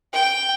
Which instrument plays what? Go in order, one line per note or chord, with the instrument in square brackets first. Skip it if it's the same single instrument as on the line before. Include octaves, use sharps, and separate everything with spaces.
[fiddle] G5